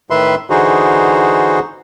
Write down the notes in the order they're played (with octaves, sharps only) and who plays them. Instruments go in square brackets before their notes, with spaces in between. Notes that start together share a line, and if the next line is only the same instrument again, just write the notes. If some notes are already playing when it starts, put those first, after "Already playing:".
[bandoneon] A2 D#3 B4 E5 C6
D3 E3 D#4 F#4 G#4 C5